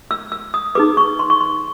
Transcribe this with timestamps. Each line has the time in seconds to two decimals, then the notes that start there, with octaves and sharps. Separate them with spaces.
0.11 E6
0.32 E6
0.54 D#6
0.75 D#4 G#4 B4 D6
0.97 C#6
1.19 C6
1.30 C#6
1.41 C6